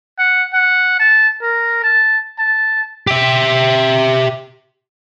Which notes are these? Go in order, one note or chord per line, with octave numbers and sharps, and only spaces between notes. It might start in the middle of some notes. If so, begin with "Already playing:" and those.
F#5
F#5
A5
A#4
A5
A5
G4 E5